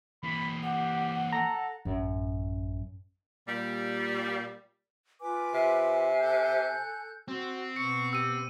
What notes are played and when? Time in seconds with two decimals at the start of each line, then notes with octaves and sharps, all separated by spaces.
0.23 E3 A#3 B5
0.63 G4 F#5
1.32 A4 A#5
1.85 A1 F#2
3.47 A#2 G3
5.21 F4 B4 G#5 D6
5.54 C3
6.20 A4 F#6 G6
7.28 C4 F#4
7.76 B2 B3 C#6 C#7
8.13 G4 E6 D#7